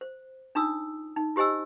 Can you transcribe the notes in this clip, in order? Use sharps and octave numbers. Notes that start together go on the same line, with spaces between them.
C5
D4 D#4 F4 D#6 E6
D#4
F4 G4 C5 D#5 G#5 E6